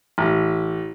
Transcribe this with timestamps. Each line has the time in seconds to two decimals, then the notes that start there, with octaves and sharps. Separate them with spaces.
0.18 A1